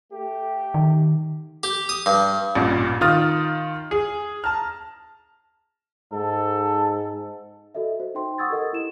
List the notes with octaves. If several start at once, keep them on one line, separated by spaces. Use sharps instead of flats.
A3 G4
D#3
G4
D#6
G2
A1 G2 A#2
D#3 F4 D#6 F6 A6
G#4
A5 A#5 F6
G#2 A4
F#4 A4 D#5 E5
F#4 C5
D#4 C5 G5 C6
F#5 C#6 D#6 E6 G#6 A6
G4 A4 A#4 D#5 F#5
E4 E7